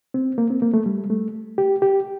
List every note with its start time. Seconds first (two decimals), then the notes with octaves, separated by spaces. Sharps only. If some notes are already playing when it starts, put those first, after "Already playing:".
0.14 C4
0.38 A#3
0.50 C4
0.62 A#3
0.74 A3
0.86 G3
1.10 A3
1.58 G4
1.82 G4